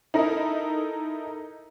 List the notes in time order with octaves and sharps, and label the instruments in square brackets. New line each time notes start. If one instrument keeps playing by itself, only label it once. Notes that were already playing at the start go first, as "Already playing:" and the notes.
[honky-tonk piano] D#4 E4 A4 A#4 D#5